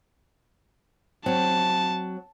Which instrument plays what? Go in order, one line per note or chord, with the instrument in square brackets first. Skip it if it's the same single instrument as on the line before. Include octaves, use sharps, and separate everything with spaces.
[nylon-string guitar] F#3 C4 [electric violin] A5